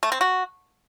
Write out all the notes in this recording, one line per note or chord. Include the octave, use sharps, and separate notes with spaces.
A3
C4
F#4